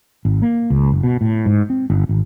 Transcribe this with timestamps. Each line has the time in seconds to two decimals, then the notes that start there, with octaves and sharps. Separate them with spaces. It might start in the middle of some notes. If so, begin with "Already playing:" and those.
0.25 G#1
0.42 A#3
0.70 C#2
0.92 F#1
1.03 B2
1.21 A2
1.46 G#2
1.70 C4
1.90 G1
2.09 G#1